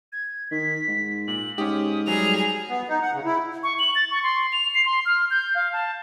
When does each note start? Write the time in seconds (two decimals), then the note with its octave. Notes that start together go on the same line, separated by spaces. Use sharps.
0.13 G#6
0.51 D#3 B6
0.88 G#2
1.28 A#2 F#7
1.58 G#2 C#4 G4 D#6
2.07 F#3 G3 G#4 F7
2.69 B3
2.88 D#4
3.02 F#5
3.13 C#3
3.25 E4
3.63 C#6
3.79 F#7
3.95 A6
4.11 C#6
4.23 C6
4.53 F7
4.74 C7
4.86 C6
5.06 F6
5.31 G6
5.55 F5
5.73 A5